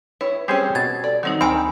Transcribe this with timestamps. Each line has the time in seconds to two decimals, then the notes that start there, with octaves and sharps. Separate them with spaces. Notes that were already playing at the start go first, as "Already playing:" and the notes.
0.21 E4 B4 C#5
0.48 G3 C4 C#4 G4 G#4 C5
0.75 B2 G#6 A6
1.04 A4 D5
1.23 D#3 F#3 G3 C4 D#4
1.41 D2 D#3 C4 G5 G#5 B5